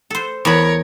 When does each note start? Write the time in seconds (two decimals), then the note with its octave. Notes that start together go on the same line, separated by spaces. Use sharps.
0.10 A4 C5
0.45 E2 A#4 C#5 B5